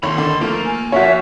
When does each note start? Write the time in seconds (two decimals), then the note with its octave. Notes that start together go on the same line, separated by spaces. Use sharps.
0.03 G#1 D#2 C#5 B5 C6
0.16 D3 D#3
0.41 F3 A3 A#3
0.66 G#5
0.92 F3 C#4 F#4 C#5 E5